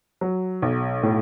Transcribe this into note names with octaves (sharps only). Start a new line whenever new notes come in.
F#3
B1
A2